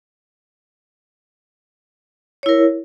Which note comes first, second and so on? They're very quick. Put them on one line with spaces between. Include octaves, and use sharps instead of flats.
C#5 E4 A#4